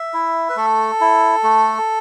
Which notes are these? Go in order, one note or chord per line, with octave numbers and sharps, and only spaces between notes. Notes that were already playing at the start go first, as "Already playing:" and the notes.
Already playing: E5
E4
B4
A3 A4
E4
A3